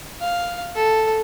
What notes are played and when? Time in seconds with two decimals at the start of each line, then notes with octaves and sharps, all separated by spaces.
0.21 F5
0.76 A4